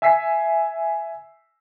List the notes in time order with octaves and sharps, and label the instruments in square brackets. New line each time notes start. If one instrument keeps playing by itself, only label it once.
[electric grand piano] E5 G#5 E6 B6 C7